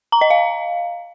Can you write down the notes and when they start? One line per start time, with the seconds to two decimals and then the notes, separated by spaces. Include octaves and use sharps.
0.12 A#5
0.21 D#5
0.30 F5